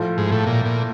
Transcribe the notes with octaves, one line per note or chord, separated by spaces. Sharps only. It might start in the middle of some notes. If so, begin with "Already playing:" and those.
Already playing: A2 F3 A3
G#2
A2
A#2
A#2